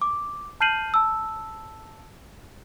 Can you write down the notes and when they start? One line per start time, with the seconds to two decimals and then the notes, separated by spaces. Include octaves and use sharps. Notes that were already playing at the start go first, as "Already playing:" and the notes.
0.02 D6
0.61 A5 F6 G6 C7 D#7 F#7
0.94 A5 E6